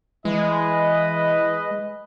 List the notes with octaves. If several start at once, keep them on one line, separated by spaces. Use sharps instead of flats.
E3 G#3 B4 D#5